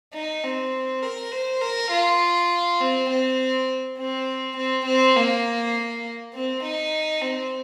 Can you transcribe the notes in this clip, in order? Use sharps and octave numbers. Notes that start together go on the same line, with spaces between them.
D#4
C4
A#4
C5
A#4
F4
C4
C4
C4
C4
C4
A#3
C4
D#4
C4